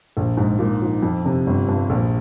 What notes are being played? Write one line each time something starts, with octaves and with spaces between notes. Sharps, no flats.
A#1
G#2
A#2
F3
F2
C3
G1
G2
A#1